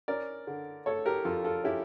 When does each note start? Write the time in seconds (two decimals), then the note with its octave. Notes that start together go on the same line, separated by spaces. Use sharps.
0.08 C#4 A#4 D5
0.47 D3
0.86 A3 A4 C#5
1.06 G4 A#4
1.25 F2 F4 A4
1.44 F4 A4
1.64 C#4 E4 G4